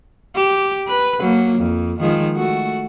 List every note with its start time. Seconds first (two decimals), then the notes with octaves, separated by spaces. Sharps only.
0.35 G4
0.88 B4
1.20 F#3 A#3
1.58 F2
2.00 D#3 F3 G#3
2.36 A3 F#4